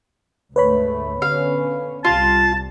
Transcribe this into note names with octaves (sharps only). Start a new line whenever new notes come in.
D2 G#2 A3 B4 C#5 B5
D3 B3 C#4 F5
C2 G3 F4 A5